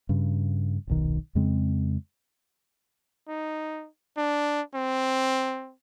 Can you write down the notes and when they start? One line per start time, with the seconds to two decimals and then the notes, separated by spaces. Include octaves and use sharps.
0.09 G2 C#3
0.87 D#1 B1 D#3
1.35 F2 C#3 G#3 C4
3.28 D#4
4.17 D4
4.75 C4